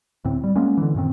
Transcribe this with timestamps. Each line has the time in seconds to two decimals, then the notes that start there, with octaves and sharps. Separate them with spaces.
0.25 D2 A2 C4
0.44 G3
0.56 G#3 A#3 B3 C#4
0.77 D3 E3
0.95 F#2 A#2 D#3 C4